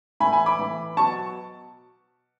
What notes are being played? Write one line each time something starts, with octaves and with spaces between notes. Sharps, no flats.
A2 E3 G#5 B5
G#5 B5
B5 D6
A2 E3
B2 F#3 A5 C#6